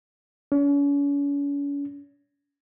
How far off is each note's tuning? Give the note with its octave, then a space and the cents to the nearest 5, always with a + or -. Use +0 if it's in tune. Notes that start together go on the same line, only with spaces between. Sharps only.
C#4 +40